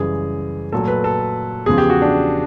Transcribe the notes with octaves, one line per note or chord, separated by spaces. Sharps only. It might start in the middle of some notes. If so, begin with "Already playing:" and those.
Already playing: F#2 C#3 E3 G3 G#4
A#2 F#3 A3 A4
B4
A4
E2 C#3 F3 G#4
G4
F#4
D4